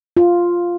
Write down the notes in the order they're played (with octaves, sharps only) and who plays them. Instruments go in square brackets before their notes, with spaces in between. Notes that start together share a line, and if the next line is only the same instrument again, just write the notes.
[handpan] F4